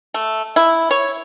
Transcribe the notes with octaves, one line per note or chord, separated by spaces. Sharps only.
A3
E4
C#5